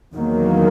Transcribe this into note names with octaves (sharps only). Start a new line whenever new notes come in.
E2 D#3 F#3 A#3